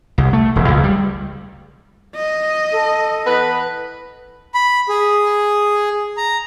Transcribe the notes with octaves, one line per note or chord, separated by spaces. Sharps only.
C2
A3
E1
C#2
G3
D#5
A4
E3 B3 B4
B5
G#4
A#5